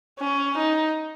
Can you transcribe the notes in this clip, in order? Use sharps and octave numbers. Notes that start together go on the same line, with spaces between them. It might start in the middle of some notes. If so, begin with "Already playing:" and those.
C#4
D#4